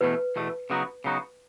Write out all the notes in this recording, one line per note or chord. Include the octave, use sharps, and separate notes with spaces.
E2 B2 A3 B4
E2 B2 A3
C#3 F#3 B3 D#4 F#4
C#3 F#3 B3 D#4 F#4